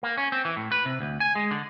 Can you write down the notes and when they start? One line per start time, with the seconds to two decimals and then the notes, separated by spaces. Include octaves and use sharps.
0.03 A#3
0.17 C#4
0.32 C4
0.45 E3
0.56 A2
0.72 B4
0.85 C3
1.01 D2
1.20 G#5
1.35 G#3
1.51 D3